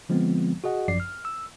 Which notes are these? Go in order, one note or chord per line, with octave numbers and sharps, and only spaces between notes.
D3 F3 G#3 B3 C4
F#4 G#4 D#5 F#5
G#1 F#2 F3 D5 C7
F6
E6